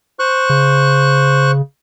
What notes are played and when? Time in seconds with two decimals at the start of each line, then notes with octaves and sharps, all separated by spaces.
0.19 C5 C#6 F#6
0.50 C#3